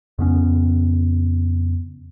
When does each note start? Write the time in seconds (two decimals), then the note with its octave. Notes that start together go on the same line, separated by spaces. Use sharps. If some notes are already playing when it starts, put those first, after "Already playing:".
0.19 F2 C#3 B3 C#4